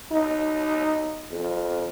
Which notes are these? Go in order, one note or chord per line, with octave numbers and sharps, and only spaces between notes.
D#4
F2